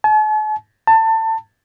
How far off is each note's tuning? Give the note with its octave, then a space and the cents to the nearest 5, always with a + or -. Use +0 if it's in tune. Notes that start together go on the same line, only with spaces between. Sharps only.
A5 -45
A5 +25